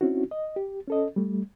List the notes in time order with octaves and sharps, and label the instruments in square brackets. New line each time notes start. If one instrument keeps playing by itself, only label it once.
[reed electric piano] C4 C#4 D#4 E4 F#4
D#5
G4
C#4 A4 D#5
G3 A3